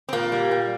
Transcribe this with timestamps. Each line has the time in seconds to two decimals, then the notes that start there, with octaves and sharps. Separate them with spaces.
0.09 C4
0.13 A#2 A#3
0.32 G3
0.51 A#2